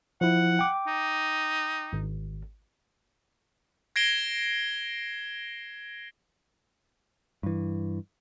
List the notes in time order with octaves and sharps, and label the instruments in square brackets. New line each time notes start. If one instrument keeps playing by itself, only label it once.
[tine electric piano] F3 E4 [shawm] F#5
[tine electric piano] G5 D6
[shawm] D#4
[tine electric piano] G#1
[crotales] G#6 A#6 C7 D7 E7 G7
[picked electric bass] G2 E3